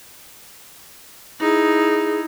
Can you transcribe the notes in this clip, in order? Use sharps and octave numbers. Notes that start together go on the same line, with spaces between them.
D#4 E4 G#4